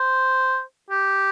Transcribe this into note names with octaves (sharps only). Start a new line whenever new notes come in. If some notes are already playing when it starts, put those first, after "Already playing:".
Already playing: C5
G4